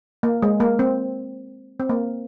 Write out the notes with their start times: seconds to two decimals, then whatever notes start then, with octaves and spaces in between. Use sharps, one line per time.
0.23 A#3
0.42 G#3
0.60 A#3
0.79 C4
1.80 C4
1.89 A#3